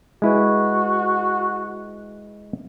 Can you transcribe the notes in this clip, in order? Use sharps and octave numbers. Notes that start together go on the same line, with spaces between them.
G#3 E4 F#4 B4